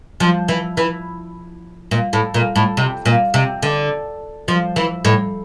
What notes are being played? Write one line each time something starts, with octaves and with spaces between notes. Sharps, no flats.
F3
E3
E3
A#2
A2
A#2
A2
C3
A#2
C3
D3
F3
E3
A2